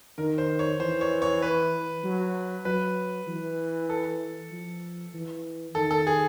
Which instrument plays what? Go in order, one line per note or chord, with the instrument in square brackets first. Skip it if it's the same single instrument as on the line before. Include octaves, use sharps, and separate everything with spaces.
[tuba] D#3 [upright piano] A#4
[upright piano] C5
C#5
[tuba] E3 [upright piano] C5
[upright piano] C#5
C#5
B4
[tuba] F#3
[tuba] F#3 [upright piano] B4
[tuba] E3
[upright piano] A4
[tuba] F3
E3
[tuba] D#3 [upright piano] A4
[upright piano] A4
G#4